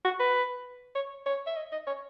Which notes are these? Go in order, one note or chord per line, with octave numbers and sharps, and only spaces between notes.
F#4
B4
C#5
C#5
E5
D#5
D#5
C#5